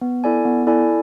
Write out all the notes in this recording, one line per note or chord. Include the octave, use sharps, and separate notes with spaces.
B3
E4 A4 D5 G#5
B3
E4 A4 D5 G#5